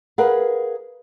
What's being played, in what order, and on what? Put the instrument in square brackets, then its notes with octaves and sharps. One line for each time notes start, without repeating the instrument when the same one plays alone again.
[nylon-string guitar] G#4 A#4 B4 F5 F#5